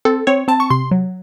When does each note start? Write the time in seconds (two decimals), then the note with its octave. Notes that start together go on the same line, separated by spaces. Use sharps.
0.05 C4 A4
0.27 C4 C#5
0.48 C4 A5
0.60 C#6
0.70 C3 C6
0.91 F#3